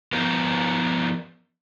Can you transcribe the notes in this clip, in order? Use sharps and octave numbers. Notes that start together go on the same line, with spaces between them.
F3 B3 G4 A#4